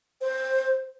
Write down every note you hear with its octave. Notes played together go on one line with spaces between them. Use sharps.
C5